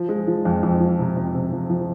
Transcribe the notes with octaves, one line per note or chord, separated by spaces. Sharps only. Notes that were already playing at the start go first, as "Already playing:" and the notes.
Already playing: F3
G#3
F3
F2
F2
F3
C3
F2
C3
F3
F3